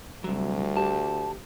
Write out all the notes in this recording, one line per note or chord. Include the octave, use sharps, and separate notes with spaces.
D2 C3 F#3 G3
G4 A5